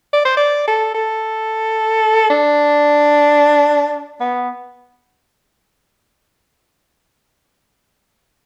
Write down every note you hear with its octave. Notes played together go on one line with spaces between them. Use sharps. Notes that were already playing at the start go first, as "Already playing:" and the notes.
D5
C5
D5
A4
A4
D4
B3